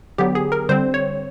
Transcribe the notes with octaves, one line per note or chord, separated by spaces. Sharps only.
D3 F#3 B3 G4
G#4
A#4
D3 G3 C4 C5
C#5